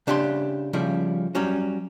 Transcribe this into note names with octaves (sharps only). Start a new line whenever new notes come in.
C#3 D4 E4 G4 A#5 C6
C#3 F3 G3 E4
F#3 G3 C#4 F#4